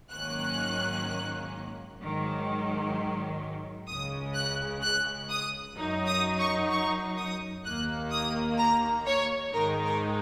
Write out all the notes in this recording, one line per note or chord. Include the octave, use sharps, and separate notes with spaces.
G#2 D#3 F#3 A#3 C#4 F#6
G#2 D#3 F#3
C#2 C#3 G#3 D#6
F#6
F#6
D#6
F#2 F#3 D#4
D#6
C#6
C#6
D#6
D#2 D#3 A#3 F#6
D#6
A#5
C#5
G#2 D#3 G#3 D#4 A#4
A#4